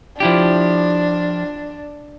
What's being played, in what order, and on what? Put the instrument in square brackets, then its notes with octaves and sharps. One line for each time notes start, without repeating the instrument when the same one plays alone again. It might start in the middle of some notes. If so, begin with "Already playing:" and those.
[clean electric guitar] F3 E4 G4 [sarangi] D4